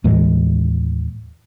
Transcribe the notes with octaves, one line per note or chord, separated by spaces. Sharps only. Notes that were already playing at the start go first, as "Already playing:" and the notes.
D#2 A2 E3 G#3